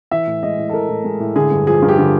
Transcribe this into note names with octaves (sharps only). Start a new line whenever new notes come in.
E3 E5
A2
G#3 D#5
A2
A4
E3 A#4
A2
G#3
A2
D3 G#4
G2
F3 G#4
G2
G4
D3 G#4